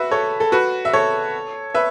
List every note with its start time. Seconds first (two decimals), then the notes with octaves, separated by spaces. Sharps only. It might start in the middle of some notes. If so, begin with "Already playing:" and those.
Already playing: F#4 B4 E5
0.11 A4 C#5
0.40 A4
0.52 F#4 B4
0.85 E5
0.93 A4 C#5
1.75 B4 E5